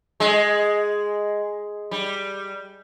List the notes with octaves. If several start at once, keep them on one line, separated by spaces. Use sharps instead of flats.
G#3
G3